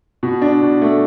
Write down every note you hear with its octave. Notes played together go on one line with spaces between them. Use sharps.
B2
D4
B2
A3